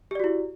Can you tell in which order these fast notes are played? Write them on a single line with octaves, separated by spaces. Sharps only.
G4 D5 F#4 E4